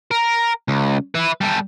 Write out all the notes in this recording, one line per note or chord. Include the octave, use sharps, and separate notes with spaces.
A#4
C#2
B4 E5
G3 A4